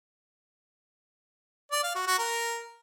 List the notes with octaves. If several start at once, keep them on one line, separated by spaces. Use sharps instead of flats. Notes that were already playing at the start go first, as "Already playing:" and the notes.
D5
F5
F#4
F#4
A#4